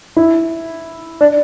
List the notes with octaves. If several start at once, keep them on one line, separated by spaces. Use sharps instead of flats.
E4
D4